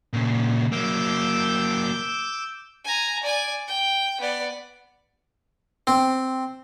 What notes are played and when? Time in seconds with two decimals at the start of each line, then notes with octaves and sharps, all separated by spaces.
0.13 A#2 C#3
0.72 F#3 A#3 D6 E6 G6
2.85 G#5 A#5
3.23 D5 G#5
3.67 G5
4.21 B3 D5
5.87 C4